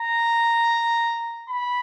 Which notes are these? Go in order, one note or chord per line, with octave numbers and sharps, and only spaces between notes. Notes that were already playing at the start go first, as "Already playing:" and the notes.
Already playing: A#5
B5